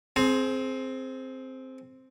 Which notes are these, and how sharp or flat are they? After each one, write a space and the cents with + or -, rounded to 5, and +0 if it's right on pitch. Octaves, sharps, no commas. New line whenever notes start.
C4 +0 G#4 +30